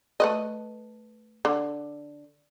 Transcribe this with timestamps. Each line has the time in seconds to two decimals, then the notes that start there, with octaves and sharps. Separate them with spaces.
0.20 A3 B4 D#5
1.45 D3